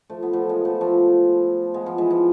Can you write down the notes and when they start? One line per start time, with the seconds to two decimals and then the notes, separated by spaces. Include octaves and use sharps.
0.10 F3 A3
0.23 B3
0.33 F3 A3
0.49 G#3 B3
0.65 F3 A3
0.81 F3 A3
1.74 G#3 B3
1.86 F3
1.98 E3 G#3
2.10 F3